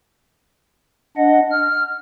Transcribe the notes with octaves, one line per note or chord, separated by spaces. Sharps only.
D4 D#5 F#5
F6